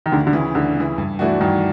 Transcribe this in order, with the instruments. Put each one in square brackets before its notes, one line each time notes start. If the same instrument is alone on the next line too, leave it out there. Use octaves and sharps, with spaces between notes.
[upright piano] D#3
[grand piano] D2 [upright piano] D3
[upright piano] D3
[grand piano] C#3 E3
[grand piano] D2 [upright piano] D3
[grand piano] C#3 E3
G2
E3 A3 D4 F#4
[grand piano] G2 [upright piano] D#3